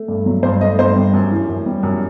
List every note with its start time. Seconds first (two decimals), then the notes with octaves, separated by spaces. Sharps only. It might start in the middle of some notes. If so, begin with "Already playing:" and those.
Already playing: A3
0.08 G2
0.26 F#3
0.43 G2 C5
0.61 A3 D#5
0.79 G2 C5
0.96 G3
1.14 F#2
1.31 E3
1.49 F#2
1.66 G3
1.83 F#2